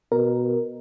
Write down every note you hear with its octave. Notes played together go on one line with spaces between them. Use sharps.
B2 A#4